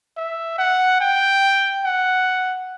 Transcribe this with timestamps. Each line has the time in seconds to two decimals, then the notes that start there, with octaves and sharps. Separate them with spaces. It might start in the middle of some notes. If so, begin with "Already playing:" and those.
0.17 E5
0.58 F#5
1.00 G5
1.85 F#5